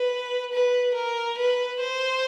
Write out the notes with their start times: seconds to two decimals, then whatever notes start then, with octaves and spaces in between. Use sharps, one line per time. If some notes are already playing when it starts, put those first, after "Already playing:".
Already playing: B4
0.53 B4
0.95 A#4
1.38 B4
1.80 C5